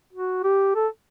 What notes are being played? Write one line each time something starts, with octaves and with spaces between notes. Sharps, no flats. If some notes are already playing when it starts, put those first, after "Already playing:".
F#4
G4
A4